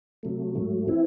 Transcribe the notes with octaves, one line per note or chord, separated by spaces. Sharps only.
C3 F#3 A3
G#2 F#3 A3
E3 C4 E4